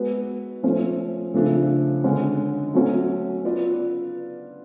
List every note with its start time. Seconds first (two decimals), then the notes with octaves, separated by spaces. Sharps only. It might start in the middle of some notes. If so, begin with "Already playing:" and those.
Already playing: G#3 B3 F#4
0.63 F3 A3 C#4 F4
1.34 C#3 F3 A3 D4
2.04 D3 G#3 C#4
2.74 F#3 A3 C#4 F#4
3.44 B3 F4 B4 D5